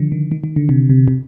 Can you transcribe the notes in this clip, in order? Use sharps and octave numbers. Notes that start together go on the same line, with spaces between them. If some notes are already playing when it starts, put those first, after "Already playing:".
Already playing: D3 D#3 F3
D#3
D#3
D#3
D3
C3
C3
C3